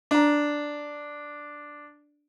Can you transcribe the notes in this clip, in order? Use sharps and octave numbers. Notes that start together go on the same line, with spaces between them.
D4 A#5